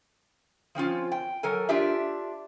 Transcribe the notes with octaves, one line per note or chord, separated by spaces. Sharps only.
F3 C4 C#4 F4
G5
F#3 A4 A#4 G#5
D4 F4 G4 E5